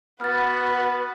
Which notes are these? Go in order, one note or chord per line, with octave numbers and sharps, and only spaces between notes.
B3 F#4 B4 F6 A6